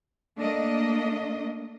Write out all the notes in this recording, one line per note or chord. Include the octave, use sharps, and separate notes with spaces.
A3 A#3 D4 D#5